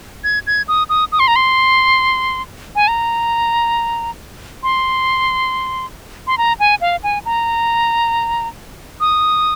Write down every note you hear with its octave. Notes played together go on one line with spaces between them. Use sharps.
G#6
G#6
D#6
D#6
D#6
C6
A#5
C6
G#5
A#5
C6
C6
A#5
G#5
F5
G#5
A#5
D#6